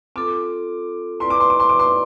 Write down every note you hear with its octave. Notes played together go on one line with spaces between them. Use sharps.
C4 F4 A4 D6
E4 B4 D5 C6
D6
C6
D6
C6
D6
C6